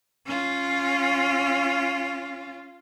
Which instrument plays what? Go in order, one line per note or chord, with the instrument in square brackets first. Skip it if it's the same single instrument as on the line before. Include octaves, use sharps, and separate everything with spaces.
[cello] C#4 F4